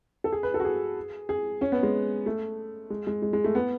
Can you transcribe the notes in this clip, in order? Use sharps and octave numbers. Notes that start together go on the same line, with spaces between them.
A4
G#4
B4
A4
F#4
G#4
G#4
C#4
B3
G#3
A3
G#3
G#3
G#3
G#3
A3
B3